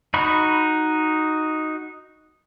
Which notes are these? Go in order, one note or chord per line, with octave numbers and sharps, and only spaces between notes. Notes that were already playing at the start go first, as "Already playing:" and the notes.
D#4 F#4 B5 C#6